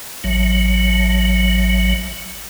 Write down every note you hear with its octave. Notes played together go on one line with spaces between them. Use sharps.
A1 F#3